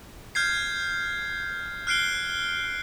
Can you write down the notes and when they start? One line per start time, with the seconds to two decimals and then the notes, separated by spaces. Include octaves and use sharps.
0.35 F6 G6 G#6 C7
1.87 F6 F#6 C7 D7 G7